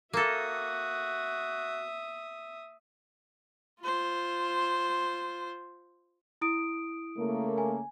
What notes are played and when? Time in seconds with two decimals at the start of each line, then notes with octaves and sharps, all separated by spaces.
0.13 A#3 F#4 A4 E5 D#6
3.82 F4 C5
6.41 E4 D#6 D7
7.18 C#3 A3 A#3
7.58 G#5